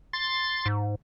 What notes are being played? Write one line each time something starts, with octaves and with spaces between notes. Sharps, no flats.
C6 A6
G#2